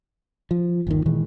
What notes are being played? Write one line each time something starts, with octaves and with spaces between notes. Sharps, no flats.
F3
G1 D#2 D#3
A#2 D#3 E3 G#3